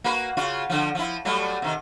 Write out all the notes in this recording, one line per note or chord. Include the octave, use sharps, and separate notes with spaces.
A#3 F#4 B4
C#3 F4 F#4
D3 F3
F3 E4
F#3 G3 A3
C3 D#3